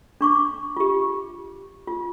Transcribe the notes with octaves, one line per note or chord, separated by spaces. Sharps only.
D4 C#6 D6
F4 G4
F4